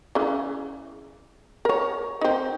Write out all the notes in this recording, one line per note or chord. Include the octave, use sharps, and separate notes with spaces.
C#3 E3
A#4 C#5
C4 D#4